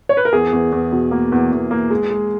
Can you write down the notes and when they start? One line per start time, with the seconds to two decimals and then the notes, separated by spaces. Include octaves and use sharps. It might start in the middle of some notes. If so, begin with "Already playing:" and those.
0.09 C#5
0.17 B4
0.25 A#4
0.33 E2 G#4
0.53 E2
0.72 E2
0.92 B2
1.11 A#3
1.32 E2
1.52 E2
1.71 A#3
1.91 G#3
2.10 G#3